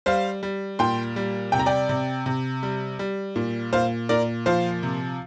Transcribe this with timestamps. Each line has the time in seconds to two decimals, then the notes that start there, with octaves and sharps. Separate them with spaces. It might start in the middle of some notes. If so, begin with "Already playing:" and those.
0.06 G3 C5 F5
0.43 G3
0.79 A#2 G5 C6
1.16 G3
1.52 C3 G5
1.59 A#5
1.66 D5 G5
1.89 C3
2.26 C3
2.63 G3
2.99 G3
3.36 A#2
3.73 A#2 C5 F5
4.09 A#2 A#4 D5
4.46 F3 C5 F5
4.83 C3